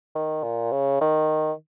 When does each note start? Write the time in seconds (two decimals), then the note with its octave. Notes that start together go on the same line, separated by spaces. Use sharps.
0.15 D#3
0.43 A#2
0.72 C#3
1.01 D#3